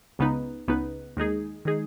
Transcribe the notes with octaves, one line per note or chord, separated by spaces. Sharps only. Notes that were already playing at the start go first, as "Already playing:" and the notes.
C#2 C#3 B3 D#4 B4
C#2 C#3 B3 D#4 B4
D#2 D#3 G#3 D#4 G#4
D#3 G#3 D#4 G#4